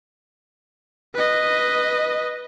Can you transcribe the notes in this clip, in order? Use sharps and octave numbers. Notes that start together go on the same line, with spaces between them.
B4 D#5